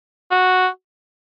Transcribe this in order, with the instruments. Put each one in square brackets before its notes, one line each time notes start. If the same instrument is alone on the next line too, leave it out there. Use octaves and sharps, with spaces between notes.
[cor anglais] F#4